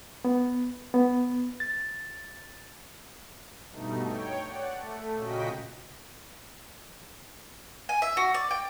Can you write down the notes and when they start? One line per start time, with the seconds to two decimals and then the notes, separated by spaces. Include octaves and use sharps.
0.25 B3
0.94 B3
1.60 A6
3.72 G2 B2 A3 D#4
4.06 C#5 G5
4.46 D5 F#5
4.75 A3
5.15 A#2 C#3 F#4 D#5 G5 B6
7.89 G#5
8.02 E5
8.17 F#4
8.34 D5
8.51 G5